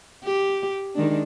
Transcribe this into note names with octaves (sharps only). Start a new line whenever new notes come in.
G4
D#3 G#3 D4